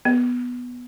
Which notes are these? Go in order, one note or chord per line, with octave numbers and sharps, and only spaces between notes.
B3